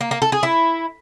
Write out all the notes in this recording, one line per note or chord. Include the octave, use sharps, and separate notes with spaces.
A#3
A#3
A4
G#4
E4